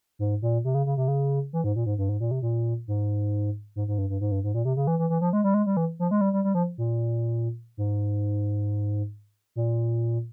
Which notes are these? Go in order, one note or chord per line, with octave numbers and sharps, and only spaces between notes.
G#2
A#2
C3
C#3
C#3
C3
C#3
E3
G#2
A#2
G#2
G2
G#2
A#2
C3
A#2
G#2
G#2
G#2
G2
G2
G#2
G2
G#2
A#2
C3
C#3
E3
E3
E3
F3
G#3
G3
G#3
G3
E3
F3
G#3
G3
G3
G3
F3
A#2
G#2
A#2